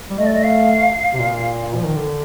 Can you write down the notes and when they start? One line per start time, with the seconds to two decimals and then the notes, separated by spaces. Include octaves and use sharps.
0.10 G3
0.18 A3 D#5
0.26 D5
0.34 D#5
0.43 F5
1.14 C3
1.19 A#2
1.75 F3
1.85 D#3
1.96 D3